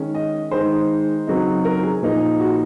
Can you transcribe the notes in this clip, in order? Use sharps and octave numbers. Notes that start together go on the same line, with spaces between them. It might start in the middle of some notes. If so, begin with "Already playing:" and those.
Already playing: D#3 G#3 C#4
D#5
D#3 G#3 D#4 C5
C#3 F#3 C4 D#4
A#4
G#4
A#2 F3 A#3 D#4
F#4